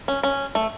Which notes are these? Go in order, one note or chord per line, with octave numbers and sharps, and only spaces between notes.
C#4
C#4
A3